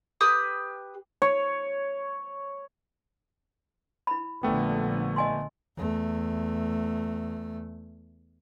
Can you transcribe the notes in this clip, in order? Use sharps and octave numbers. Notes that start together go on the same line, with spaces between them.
G4 B4 D#6
C#5
E4 B5
A#1 D3 A3 B3 G5
D#5 G#5 C6
E2 A3